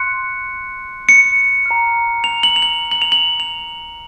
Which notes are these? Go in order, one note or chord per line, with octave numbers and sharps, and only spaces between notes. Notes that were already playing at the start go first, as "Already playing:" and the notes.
Already playing: C6 F#6 C#7
C#7
A#5 F6
F7
F#7
F7
F#7
F#7
F7
F#7
F7